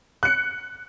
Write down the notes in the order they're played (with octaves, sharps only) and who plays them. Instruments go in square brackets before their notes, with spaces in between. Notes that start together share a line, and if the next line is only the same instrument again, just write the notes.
[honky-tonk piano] F#6 C#7